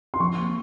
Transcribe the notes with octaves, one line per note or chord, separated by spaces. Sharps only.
C6
F3 C#6
A#3